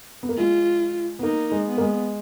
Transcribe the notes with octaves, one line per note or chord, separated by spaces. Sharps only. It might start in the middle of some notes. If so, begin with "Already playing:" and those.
B3
A#3
G#3 F4
B3
A#3 D#4
G#3
B3
A#3
G#3